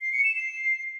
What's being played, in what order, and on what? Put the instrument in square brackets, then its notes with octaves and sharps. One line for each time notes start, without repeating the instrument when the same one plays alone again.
[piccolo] C7
C#7
E7
C7